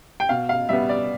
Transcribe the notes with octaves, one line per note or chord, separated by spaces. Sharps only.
G5
B2 F5
F5
G3 B3 E5
D5